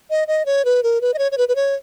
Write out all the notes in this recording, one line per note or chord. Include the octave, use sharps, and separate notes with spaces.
D#5
D#5
C#5
B4
A#4
B4
D#5
C#5
C#5
B4
B4
C#5